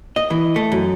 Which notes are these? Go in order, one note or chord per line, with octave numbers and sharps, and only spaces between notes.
D#5
E3
A3
F#2